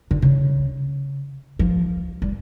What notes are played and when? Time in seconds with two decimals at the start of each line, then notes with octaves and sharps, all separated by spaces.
0.11 D3
0.22 C#3
1.59 F3
2.22 G3